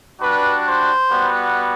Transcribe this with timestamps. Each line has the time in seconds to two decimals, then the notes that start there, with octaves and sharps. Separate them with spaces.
0.20 G3 D4 F#4 B4
0.65 C5
1.09 G3 B3 F#4